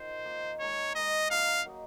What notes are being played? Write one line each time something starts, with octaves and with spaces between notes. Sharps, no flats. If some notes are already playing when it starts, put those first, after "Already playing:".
Already playing: D#3 F4 C5
D#3 A#3 F4
G#3 D#4 A#4 C#5
G#3 D#4 A#4 D#5
F#3 A#3 D#4 F5
F#3 A#3 D#4